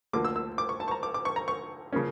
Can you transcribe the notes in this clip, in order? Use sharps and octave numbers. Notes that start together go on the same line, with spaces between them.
D2 D3 F3 A#3 D6
E6
E6
D6
C#6
A5
C#6
A#5
D6
D6
C#6
A#5
C#6
C#3 F3 A#3 C#4